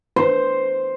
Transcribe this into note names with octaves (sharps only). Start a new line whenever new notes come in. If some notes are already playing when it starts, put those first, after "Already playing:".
C5